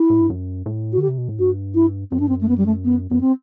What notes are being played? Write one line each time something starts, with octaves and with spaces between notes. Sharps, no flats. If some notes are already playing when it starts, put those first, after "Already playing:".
Already playing: E4
A2
G2
F#2
A2
F#4
D3 G4
C3
B2
A2
G2 F#4
E4
F#2 C4
G2 D4
C4
F#2
A3
B3
G3
A3
B3
F#2 B3
C4